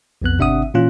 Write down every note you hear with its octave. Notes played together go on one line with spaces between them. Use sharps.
B1 F2 B3 F#6
G#1 C3 D4 E5 F#5 D#6
A#2 E3 C#4 F4 F#6